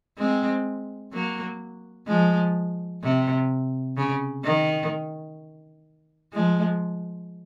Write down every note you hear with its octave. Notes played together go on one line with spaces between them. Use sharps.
G#3 C4
F#3 A#3
F3 G#3
C3
C#3
D#3
F3 G#3